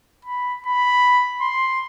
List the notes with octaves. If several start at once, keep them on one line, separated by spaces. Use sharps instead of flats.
B5
B5
C6